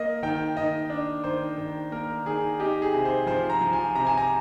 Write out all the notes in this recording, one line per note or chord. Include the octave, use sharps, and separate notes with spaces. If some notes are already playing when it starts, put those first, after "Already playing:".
Already playing: A#3 D#5
D#3 G5
D#3 D#5
D4
D#3 C5
D#3
A#3 A#4
D#3 G#4
D#4 G4
G#4
C3
C5
F3 C5
A#5
F3
G#5
C3 A#5
G#5
A#5